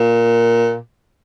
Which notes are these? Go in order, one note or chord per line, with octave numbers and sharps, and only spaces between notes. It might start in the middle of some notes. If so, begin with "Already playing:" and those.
Already playing: A#2